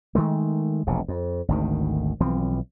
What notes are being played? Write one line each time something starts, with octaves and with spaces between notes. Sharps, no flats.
D#3 G#3 A3
E1 A#1 C3
F2
G#1 D2 D#3
B1 E3 F3 C4